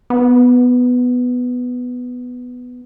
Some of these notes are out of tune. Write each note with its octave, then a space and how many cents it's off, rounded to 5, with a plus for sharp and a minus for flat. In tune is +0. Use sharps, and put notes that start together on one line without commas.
B3 +5